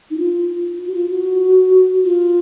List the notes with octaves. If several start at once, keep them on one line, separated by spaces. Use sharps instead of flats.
D#4
F4
F4
F#4
F4
F#4
F4